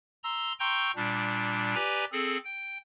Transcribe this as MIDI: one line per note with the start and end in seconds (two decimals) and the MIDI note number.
0.24 0.53 82
0.24 0.53 84
0.24 0.53 88
0.60 0.91 79
0.60 0.91 82
0.60 0.91 84
0.60 0.91 85
0.60 0.91 88
0.60 0.91 91
0.96 1.75 46
0.96 1.75 55
0.96 1.75 62
1.75 2.05 67
1.75 2.05 71
1.75 2.05 74
1.75 2.05 80
1.75 2.05 82
2.12 2.37 60
2.12 2.37 68
2.12 2.37 69
2.45 2.78 79